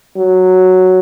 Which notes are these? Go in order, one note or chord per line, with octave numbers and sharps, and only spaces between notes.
F#3